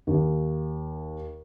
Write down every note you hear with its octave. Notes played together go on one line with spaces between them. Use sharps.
D#2